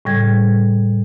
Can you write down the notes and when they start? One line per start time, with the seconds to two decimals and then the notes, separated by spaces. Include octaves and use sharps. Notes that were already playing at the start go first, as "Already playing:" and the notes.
0.05 A2 C#3 G3 G#6